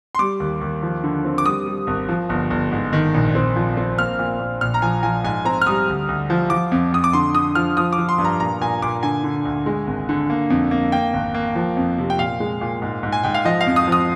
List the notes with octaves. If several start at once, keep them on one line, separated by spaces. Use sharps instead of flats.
C6
G3 D6
D#2
D#2
F3
D3
C4
D6
G3 D#6
G3
G#1
F3
G1
G1
G#2
D#3
A#1
C4
F3
C4
A#3 F6
A#2
A#2
A#1 F6
A#5
F3 G#5
F3 G#5
G#2 G#5
C4 A#5
F6
G3 D#6
D2
D2
F3
F3 D6
F2
F2 D#6
D6
D3 C6
D3 D#6
F3 F6
F3 D#6
D6
F3
C6
G2
A#5
A#2 A#5
A#2 G#5
A#2 D6
D3 G#5
D3
D2
G#3
G#1
D3
A#3
F2
A#3
A#3 G5
G#1
A#3
F3
F2
C3
G5
A#2 F5
G#3
A#2
G#2
G#2
G#5
G#2 G5
F5
F3 D#5
F5
F2
D#6
F3 D#6